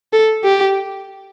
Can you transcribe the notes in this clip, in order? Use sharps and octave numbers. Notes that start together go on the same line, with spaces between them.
A4
G4